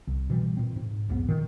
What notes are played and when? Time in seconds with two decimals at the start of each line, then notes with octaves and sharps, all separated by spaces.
0.07 C2
0.30 B2 E3 F3 G3
0.57 A#2 C4
0.76 G#2
1.08 B1 F2 G#2 B3
1.29 A#2 D#3